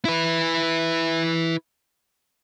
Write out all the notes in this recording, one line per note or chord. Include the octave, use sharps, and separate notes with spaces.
E4 B4